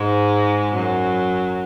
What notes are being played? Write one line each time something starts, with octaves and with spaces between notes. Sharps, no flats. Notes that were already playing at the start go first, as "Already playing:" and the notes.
Already playing: G#2 G#3
F#2 F#3